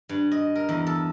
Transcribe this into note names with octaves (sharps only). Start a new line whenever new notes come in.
G2
D#5
A#4
E2
A4